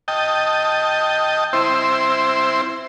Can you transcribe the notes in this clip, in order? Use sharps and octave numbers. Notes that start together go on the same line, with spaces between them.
D#5 G5 A5
C4 E4 C5